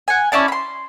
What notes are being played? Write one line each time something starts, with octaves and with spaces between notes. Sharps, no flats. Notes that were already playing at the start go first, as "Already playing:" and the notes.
F#5 G#5
C#4 E4 D5 A5
B5 C6